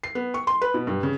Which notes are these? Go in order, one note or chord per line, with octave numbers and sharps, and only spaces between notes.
C7
B3
C#6
C6
B4
B2
G2
C#3